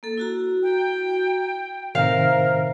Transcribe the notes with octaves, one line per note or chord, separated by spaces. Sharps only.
A#3 A4
E4 F#4 A#5
G5
A2 C3 D#3 A#4 C5 E5 F5